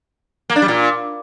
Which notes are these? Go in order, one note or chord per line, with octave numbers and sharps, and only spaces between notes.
A#3
D4
G3
A#2